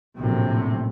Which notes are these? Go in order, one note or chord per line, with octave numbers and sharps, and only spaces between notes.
A#1 F#2 A2 C3